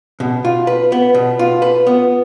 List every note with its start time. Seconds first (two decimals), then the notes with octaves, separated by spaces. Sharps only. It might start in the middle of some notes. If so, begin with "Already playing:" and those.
0.20 B2
0.45 F4
0.67 B4
0.92 B3
1.15 B2
1.39 F4
1.62 B4
1.87 B3